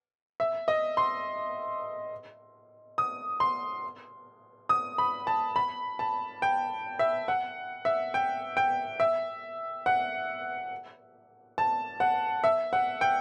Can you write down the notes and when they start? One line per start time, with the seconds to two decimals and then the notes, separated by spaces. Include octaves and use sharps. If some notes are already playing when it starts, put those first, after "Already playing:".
0.40 E5
0.68 D#5
0.97 C6
2.98 D#6
3.40 C6
4.69 D#6
4.98 B5
5.27 A5
5.56 B5
5.99 A5
6.42 G5
6.99 E5
7.28 F#5
7.85 E5
8.14 G5
8.57 G5
9.00 E5
9.86 F#5
11.58 A5
12.00 F#5
12.44 E5
12.73 F#5
13.01 G5